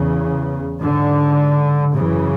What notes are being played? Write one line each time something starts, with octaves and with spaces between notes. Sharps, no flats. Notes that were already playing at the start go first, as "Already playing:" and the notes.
Already playing: E2 C#3
G#2 D3
F#2 C#3 E3